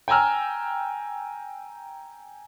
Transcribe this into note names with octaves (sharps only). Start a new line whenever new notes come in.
G5 G#5 A#5 E6 F6